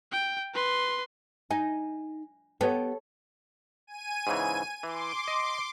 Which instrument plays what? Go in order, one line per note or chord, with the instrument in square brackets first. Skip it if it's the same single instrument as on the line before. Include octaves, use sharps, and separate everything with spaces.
[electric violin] G5
B4 C6
[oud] D#4 [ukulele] G#5
[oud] B3 G4 [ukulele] A4 C#5
[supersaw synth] G#5 D#7
[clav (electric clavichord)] G#2 C#3 E3
[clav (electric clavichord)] E3 [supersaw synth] C6 D6
[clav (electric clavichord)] D#5